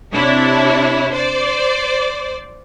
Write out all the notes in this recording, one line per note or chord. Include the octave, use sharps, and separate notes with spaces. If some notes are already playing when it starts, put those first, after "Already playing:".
C3 D4 E4 C#5
C5 D5